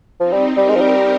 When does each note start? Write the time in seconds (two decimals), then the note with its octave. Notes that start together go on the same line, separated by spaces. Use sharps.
0.20 F3 C4 D#4
0.33 G3
0.56 G3 G4 A#4
0.69 G#3
0.76 F3
0.81 G3